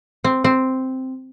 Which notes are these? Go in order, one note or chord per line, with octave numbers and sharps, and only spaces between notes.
C4
C4